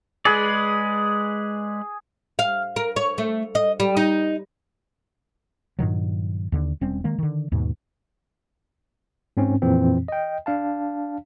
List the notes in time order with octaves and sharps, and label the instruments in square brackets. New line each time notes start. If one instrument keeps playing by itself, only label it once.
[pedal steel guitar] G#3 B4 D5 [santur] G#4
[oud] F5
A#4
C#5
A3
D#5
G3
D#4
[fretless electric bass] G2 A#2 D#3 F#3
D#2 D3
E1 G3 C4 C#4
D#3 G#3 A#3
D3 D#3
D#2 G#2 B2
[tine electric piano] G#2 C4 C#4
F2 A#2 E3 C4
D#5 G5
D4 F5 A5